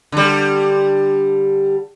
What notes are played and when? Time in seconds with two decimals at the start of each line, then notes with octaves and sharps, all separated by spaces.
0.12 D3 G3